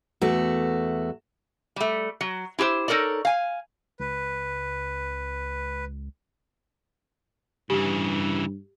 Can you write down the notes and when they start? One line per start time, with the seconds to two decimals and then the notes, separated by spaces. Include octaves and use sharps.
0.21 E2 A3 F#4
1.76 G3 A3
2.21 F#3
2.59 E4 G4 G#4 C5
2.88 D#4 A4 A#4 C#5 D5
3.25 F5 G#5
4.00 C#2 B4
7.70 G2 C#3 E3 G4